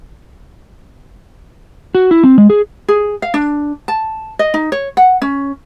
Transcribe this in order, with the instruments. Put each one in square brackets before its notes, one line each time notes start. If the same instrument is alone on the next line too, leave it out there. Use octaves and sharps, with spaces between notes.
[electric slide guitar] F#4
E4
C4
G#3
G#4
[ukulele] G#4
F5
D4
A5
D#5
D#4
C#5
F#5
C#4